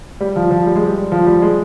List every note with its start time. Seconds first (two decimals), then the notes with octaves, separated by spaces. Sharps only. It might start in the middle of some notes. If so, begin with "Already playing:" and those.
0.20 G3
0.36 F3
0.51 F3
0.66 G3
0.76 G#3
0.86 G3
1.12 F3
1.27 G3
1.42 G#3